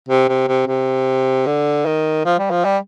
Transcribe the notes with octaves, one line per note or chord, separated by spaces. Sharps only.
C3
C3
C3
C3
D3
D#3
F3
G3
F3
G3